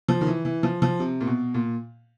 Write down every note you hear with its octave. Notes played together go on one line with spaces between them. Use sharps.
F3
D#3
E3
E3
F3
F3
C3
A#2
B2
A#2